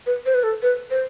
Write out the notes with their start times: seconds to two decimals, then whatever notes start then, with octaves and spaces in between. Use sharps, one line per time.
0.06 B4
0.26 C5
0.35 B4
0.43 A4
0.62 B4
0.91 C5